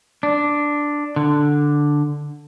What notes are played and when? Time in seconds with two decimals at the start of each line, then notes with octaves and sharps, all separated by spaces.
0.23 D4
1.16 D3